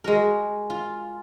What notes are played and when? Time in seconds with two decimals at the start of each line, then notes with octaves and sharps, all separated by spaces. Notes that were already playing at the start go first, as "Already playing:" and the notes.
0.04 G#3 F#4 A#4
0.70 F4